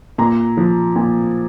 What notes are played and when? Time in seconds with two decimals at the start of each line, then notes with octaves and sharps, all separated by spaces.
0.18 A#2 A#5
0.57 F3
0.96 A#2